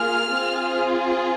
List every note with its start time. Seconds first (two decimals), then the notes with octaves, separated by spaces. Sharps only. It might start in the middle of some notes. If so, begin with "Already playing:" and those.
Already playing: A#3 F4 G#4 F6
0.30 C4 F4 G#4